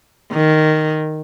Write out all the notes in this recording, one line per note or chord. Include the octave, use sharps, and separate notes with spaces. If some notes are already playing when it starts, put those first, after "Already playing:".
D#3